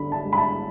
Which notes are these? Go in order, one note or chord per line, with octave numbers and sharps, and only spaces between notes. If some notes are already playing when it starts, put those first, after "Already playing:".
Already playing: D3 B5
A5
G#3
B5
A5